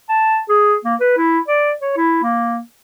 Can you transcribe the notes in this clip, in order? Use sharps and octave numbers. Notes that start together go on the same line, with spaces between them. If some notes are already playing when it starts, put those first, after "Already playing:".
A5
G#4
A#3
B4
E4
D5
C#5
E4
A#3